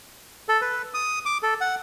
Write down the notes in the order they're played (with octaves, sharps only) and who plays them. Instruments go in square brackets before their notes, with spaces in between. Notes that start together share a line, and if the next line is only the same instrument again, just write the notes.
[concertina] A4
B4
D#6
D6
A4
F#5